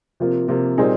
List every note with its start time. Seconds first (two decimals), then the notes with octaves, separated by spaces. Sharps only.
0.20 C3 F3 A#3 F4
0.48 C3 F3 A#3 F4
0.78 A#2 G3 C4 D#4 G#4